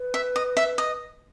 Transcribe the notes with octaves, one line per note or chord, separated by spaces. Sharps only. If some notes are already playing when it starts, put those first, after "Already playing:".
Already playing: B4
E5
D#5
E5
D#5